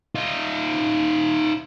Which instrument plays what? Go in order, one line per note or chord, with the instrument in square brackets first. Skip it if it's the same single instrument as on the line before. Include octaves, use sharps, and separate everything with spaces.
[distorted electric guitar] D#4 F4